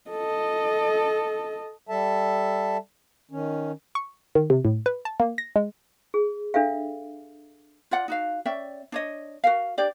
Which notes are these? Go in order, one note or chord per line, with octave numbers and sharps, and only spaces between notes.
A4 D#5
G3 A4 E5 A5
D#3 C#4
C#6
D#3
C3
A2
B4
A5
A#3
A#6
G#3
G#4
D4 A4 E5 F5
F4 D5 F#5
D#4 F#4 F5
C#4 D5 E5 G5
D4 C#5 D#5
F#4 A#4 F5
D4 G4 D5